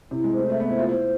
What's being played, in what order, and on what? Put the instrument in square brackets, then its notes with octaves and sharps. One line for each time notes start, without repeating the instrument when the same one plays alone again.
[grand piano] C3 [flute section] E4
[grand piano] G#3
[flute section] C5
[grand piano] A3
[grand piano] A3 [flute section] E5
[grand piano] B3
[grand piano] E4 [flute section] C5
[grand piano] F4
[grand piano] E4 [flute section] C5